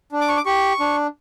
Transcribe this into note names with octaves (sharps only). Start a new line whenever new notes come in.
D4
D6
C#6
D6
G4 C#6
D4